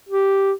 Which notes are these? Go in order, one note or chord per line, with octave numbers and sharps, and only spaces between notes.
G4